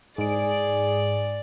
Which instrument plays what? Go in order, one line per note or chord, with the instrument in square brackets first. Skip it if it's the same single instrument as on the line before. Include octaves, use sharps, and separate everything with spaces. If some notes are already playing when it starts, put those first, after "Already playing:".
[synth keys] G#2 D7 [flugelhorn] G#4 [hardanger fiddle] D5